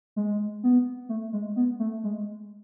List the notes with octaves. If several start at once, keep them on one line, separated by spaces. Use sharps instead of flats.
G#3
B3
A3
G#3
B3
A3
G#3